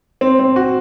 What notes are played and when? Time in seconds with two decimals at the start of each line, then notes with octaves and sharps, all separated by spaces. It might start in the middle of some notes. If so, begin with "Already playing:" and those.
0.21 C4
0.39 C4
0.56 F#4